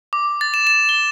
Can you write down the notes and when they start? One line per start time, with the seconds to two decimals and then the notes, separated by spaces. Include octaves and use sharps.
0.13 D6
0.41 A6
0.54 E7
0.67 E7
0.89 G7